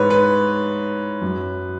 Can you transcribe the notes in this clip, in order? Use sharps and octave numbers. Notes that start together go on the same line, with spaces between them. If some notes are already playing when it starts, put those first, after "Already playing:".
Already playing: G#2 E3 B4 C#5
B4
F#2 F#3